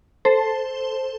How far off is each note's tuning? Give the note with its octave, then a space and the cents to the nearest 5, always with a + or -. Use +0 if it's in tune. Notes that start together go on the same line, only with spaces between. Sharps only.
A4 +0 C5 +0